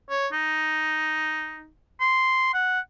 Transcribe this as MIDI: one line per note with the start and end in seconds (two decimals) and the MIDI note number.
0.10 0.28 73
0.32 1.69 63
2.01 2.51 84
2.54 2.80 78